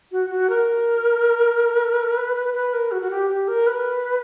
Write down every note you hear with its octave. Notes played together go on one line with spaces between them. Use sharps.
F#4
F#4
A#4
B4
B4
B4
A#4
F#4
F#4
G4
G4
A#4
B4